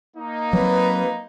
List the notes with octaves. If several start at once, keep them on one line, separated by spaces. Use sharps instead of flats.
A#3 D#4
F#3 C4 B4